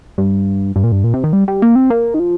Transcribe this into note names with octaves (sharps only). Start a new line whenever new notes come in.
G2
G2
A#2
G2
A#2
C3
D#3
G3
G3
A#3
C4
A#3
D#3
F3